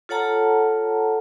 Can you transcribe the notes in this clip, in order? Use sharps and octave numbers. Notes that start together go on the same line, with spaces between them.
F4 A4 C#5 F#5 A5 A#5